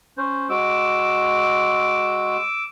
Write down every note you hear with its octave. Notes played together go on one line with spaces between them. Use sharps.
C#4 C5
G#3 F#4 D6 E6